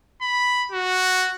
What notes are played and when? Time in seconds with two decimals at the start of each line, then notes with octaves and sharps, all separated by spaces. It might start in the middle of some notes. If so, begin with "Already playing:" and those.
0.22 B5
0.72 F#4